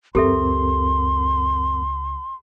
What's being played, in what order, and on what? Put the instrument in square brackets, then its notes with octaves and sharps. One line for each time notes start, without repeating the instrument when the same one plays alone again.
[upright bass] C#2 [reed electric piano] F#2 C4 A#4 [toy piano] G4 A4 E5 [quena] C6